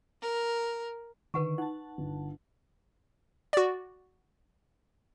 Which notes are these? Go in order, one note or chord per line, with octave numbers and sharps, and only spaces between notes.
A#4
D3 D#3 B4 F#5 C#6
D#4 F#5 A5
G1
F#4 D5